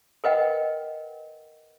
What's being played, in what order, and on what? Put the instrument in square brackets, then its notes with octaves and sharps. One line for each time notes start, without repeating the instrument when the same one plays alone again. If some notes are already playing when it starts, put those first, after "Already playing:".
[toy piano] A#4 B4 D#5 F#5 G5